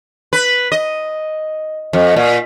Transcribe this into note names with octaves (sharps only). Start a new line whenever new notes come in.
B4
D#5
F2
A#2